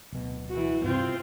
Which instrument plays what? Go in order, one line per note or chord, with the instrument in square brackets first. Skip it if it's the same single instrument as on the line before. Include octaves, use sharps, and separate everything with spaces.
[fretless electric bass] D1 B2
[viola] E3 F#4
[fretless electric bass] G2 C3 [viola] C4 F4